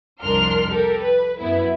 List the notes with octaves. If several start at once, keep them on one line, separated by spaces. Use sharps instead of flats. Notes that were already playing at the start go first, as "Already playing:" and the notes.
C2 F2 D4 A#4 C6 F6
G4 A4 A#4
B4
F#2 B3 E4